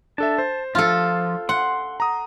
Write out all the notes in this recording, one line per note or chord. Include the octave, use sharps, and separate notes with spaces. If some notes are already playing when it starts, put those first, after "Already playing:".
D4 A4 E5 A5
C5
F3 F4 A4
F#5 C6
A#5 D#6